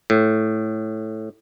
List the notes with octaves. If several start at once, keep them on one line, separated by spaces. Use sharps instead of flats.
A2